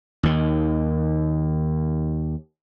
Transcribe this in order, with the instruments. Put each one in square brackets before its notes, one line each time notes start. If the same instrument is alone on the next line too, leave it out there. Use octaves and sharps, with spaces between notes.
[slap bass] D#2 D#3